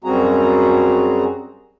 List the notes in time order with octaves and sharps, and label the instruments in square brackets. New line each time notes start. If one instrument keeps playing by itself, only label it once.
[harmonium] F#2 G3 C4 F#4 G#4 A#5